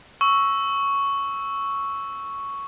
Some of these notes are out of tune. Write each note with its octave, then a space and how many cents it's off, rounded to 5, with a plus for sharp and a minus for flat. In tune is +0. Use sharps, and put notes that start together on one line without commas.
C#6 +0 E6 +0